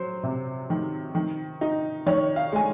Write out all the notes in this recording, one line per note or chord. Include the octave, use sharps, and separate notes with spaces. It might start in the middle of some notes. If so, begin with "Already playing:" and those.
Already playing: F#3 C5
C3
D#3
D#3
D#4
D#3 C#5
F5
G#3 G#5